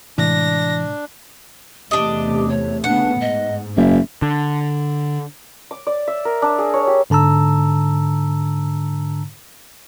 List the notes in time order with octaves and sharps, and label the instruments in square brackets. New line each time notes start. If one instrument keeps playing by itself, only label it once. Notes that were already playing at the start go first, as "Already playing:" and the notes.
[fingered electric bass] A2 C3 G#3 [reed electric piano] E3 [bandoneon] D4 [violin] A#6
[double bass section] E2 C3 A3 [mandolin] D4 D#5 [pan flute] G4
[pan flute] C#5
[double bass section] C#3 A3 B3 [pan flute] D4 [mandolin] F#5
[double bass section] G#2 [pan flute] D#5
[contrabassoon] F#1 [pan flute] E5
[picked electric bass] D3
[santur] D6
D5
E5
A#4
D4
G#4
C#5
G4
[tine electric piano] G#2 D3 A5 A#5 E6